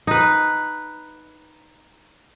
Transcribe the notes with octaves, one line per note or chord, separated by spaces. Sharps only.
D#4 B4